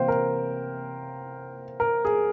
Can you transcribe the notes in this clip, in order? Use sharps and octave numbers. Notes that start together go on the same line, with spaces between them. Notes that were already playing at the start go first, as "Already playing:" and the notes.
Already playing: C3 E3 A#3 C5 F5 G5
A#4
A#4
G#4